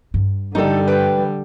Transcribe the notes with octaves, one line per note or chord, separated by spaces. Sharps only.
G2
D3 G3 D#4 A4
B4 G5